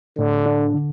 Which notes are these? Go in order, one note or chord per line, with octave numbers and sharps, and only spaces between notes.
A2 D3
D4
D3